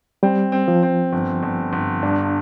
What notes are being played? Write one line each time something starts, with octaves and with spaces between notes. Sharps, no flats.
G3 C4
C4
F3
C4
G1
G1
G1
G2 D4